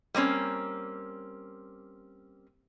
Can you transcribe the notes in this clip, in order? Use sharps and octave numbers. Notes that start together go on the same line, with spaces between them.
G3 A#3 C4 C#4